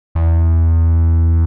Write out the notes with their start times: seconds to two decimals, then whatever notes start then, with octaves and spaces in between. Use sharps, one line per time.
0.15 E2